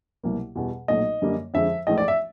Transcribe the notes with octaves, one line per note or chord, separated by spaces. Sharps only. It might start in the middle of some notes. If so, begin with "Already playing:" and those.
C2 B2 F#3 A#3
E2 B2 G3
B1 A#2 F#3 A3 D#5
F#2 D3 G3 A#3
F2 D3 F3 G#3 E5
A#1 G#2 E3 A3 D#5
D5
E5